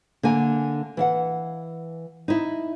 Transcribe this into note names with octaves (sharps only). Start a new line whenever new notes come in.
D3 A#3 G#5
E3 F5 F#5
D#4 E4